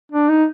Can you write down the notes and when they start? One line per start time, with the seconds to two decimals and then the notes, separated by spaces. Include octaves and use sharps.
0.12 D4
0.29 D#4